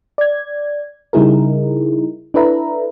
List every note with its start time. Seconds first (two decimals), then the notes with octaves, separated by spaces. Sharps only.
0.18 D5 G#6
1.13 C#3 G3 D#4 E4 G#4 A#4
2.34 D4 E4 A4 B4 E5 A#5